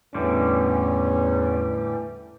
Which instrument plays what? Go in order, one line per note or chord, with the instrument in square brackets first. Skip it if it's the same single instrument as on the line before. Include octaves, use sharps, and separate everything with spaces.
[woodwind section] E2 [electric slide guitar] A2 D3 G3 [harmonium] E3 [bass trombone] C#4